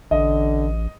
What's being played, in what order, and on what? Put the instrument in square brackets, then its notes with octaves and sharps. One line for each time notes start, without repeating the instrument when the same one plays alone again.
[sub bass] A1 [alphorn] D3 [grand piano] D#5